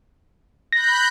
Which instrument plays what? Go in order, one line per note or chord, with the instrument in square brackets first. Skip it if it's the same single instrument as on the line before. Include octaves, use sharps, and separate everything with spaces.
[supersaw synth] B5 F#6 G6 [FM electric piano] A#6